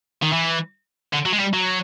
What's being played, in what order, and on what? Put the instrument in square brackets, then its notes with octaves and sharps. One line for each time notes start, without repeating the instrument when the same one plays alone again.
[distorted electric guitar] D#3
E3
D3
F#3
G#3
G3
F#3